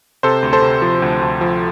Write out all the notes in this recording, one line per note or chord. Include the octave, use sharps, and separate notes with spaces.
C3 A4 C5
D2
A4 C5
C3
F3
D2
D2
F3